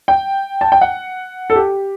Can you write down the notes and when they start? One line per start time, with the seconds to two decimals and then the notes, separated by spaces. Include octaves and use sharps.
0.08 G5
0.61 A5
0.72 G5
0.81 F#5
1.50 A4
1.56 G4